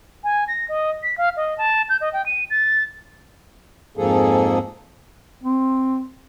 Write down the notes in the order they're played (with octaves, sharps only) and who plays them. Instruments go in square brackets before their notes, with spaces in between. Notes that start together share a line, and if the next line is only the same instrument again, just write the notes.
[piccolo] G#5
A#6
D#5
B6
F5
D#5
A5
G6
D#5
G5
D#7
A6
[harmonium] F2 G#2 F3 A#3 G#4 A4
[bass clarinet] C4